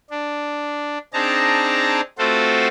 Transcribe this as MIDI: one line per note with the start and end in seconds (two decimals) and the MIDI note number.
0.10 0.98 62
1.14 2.01 60
1.14 2.01 62
1.14 2.01 63
1.14 2.01 68
1.14 2.01 81
1.14 2.01 82
2.18 2.68 57
2.18 2.68 60
2.18 2.68 65
2.18 2.68 66
2.18 2.68 69
2.18 2.68 72